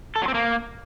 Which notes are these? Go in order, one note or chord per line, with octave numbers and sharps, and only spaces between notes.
A4
F#3
C4
A#3